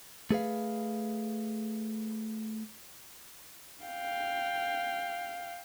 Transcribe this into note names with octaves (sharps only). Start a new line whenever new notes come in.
A3 G#4 B4 F5
F5 G5